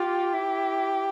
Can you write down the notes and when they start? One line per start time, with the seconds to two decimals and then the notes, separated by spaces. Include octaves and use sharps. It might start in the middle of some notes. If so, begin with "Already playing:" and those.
Already playing: F4 G4
0.33 E4